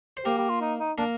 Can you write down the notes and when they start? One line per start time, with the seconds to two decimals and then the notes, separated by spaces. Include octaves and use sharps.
0.17 C5
0.25 A#3 G4 A#4
0.38 G4
0.49 F4
0.61 D#4
0.80 D#4
0.98 A#3 D4 A#4